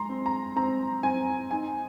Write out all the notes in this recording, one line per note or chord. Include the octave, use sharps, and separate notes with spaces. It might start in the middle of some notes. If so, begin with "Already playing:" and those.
Already playing: G#3 A#5 C6
C4
A#5
C4 A#5
C4 G#5
D#4 G#5